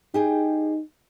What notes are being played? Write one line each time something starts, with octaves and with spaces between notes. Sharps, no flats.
D#4 G4 G#4 G5